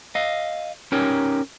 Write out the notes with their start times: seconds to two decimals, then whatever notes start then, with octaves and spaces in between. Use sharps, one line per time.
0.15 D#5 F5
0.92 C#4 D#4 G4 A#4 C#5